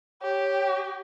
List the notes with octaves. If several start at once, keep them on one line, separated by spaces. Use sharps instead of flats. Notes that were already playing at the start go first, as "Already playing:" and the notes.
G4 C#5